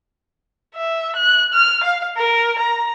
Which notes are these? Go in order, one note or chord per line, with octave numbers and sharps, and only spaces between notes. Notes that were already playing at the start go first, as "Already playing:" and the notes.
E5
F#6
F6
F5
A#4
A#5